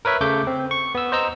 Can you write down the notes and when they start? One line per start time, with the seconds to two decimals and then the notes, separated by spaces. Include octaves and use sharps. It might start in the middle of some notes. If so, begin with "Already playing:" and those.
0.05 A#4 B4 C#5 E5
0.21 C#3 A3 D6 G6
0.47 C4
0.71 C#6
0.95 B3 E6
1.12 C5 D#5 A#5 E6 G6